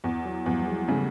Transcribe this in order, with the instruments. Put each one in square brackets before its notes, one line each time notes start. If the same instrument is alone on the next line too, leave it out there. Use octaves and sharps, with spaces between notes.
[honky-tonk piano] E2
[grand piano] F#3
[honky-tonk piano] E2 [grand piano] F3 G3
[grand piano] G3
F#3 G#3
G#3
[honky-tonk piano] C#3 [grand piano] G3 A3